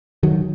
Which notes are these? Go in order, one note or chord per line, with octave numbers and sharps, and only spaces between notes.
D#3 F#3